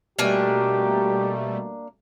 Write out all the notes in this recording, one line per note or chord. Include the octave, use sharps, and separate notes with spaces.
B2 G3 A3 A#3 D4 G4 G#5